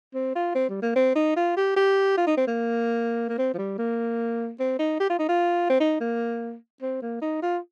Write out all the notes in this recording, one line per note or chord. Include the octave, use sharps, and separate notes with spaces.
C4
F4
C4
G3
A#3
C4
D#4
F4
G4
G4
F4
D#4
C4
A#3
A#3
C4
F3
G3
A#3
C4
D#4
G4
F4
D#4
F4
C4
D#4
A#3
C4
A#3
D#4
F4